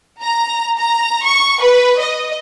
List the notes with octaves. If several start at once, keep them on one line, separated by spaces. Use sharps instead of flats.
A#5
A#5
C#6
B4
D#5